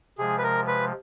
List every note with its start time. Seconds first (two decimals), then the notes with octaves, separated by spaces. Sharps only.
0.18 C3 F3 G#3 G#4
0.38 B4
0.43 A#4
0.67 B4